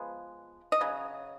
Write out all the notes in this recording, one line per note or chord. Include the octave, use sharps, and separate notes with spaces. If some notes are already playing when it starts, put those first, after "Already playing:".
Already playing: F3 G#3 B3
D#5
C#3 F#3